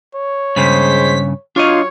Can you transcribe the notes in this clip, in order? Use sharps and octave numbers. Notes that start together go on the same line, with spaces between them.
C#5
G2 C#3 G#3 C5 B6
F#3 D4 F4 C#5 D#5